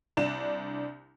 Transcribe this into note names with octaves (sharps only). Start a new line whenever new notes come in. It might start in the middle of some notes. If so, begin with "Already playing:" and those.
C2 D4 E7